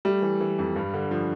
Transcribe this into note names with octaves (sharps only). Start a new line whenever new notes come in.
G3 A3
E3
E3
F2
G2
D3
F3